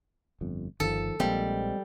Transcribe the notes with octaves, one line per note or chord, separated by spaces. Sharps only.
G1 F2
G1 D#3 F3 A4
A#1 F3 G3 G#3 A#3 C4